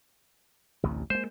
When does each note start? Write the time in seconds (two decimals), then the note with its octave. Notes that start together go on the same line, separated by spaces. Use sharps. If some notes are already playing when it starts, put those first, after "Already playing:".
0.83 A1 D2 C3
1.10 G#3 A#3 C5